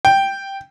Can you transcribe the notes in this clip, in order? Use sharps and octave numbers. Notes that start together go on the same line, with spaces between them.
G5